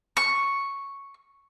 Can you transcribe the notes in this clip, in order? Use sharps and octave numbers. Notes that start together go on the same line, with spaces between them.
C#6